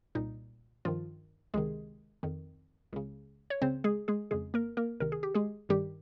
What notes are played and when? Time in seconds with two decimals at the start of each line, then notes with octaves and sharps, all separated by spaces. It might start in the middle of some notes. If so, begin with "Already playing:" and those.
0.15 C2 A#2 D#4
0.85 G2 D#3 F3 F4
1.54 C#2 C3 D#3 G#3 G#4
2.23 F2 D#3
2.93 C#2 C#3
3.50 C#5
3.62 C#2 C#3 C4 C5
3.84 G#3 G#4
4.08 G#3 G#4
4.31 F2 C#3 G#3 G#4
4.54 A#3 A#4
4.77 A#3 A#4
5.00 C#2 C3 D#3 A#4
5.12 G#4
5.23 G4
5.35 G#3 G#4
5.69 G2 D#3 G3 G4